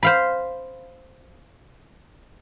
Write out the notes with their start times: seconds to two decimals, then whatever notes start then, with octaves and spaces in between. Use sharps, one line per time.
0.03 C5 F5 B5